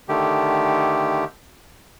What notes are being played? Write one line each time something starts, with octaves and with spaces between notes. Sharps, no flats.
D3 D#3 A3 G4